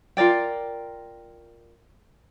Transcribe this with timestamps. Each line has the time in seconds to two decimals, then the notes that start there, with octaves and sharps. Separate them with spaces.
0.17 F4 A#4 D5 G5